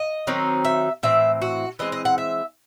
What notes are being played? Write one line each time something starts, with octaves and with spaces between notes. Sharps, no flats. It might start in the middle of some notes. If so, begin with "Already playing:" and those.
Already playing: D#5
D#3 F#3 C4 D#4
E5
A2 E3 C4 E5
F#4
E3 G#3 C4 D#5
D#5
F#5
E5